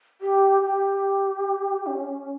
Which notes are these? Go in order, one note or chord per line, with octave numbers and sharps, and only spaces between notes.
G4
G4
C#4